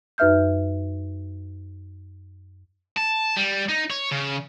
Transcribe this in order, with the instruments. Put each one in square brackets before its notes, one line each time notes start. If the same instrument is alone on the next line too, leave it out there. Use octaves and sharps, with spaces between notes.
[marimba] F#2 D#4 B4 E5 F6 G6
[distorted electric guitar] A5
G3
D#4
C#5
C#3